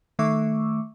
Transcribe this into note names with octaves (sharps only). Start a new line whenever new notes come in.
D#3 A3 E5 C#6 D6 E6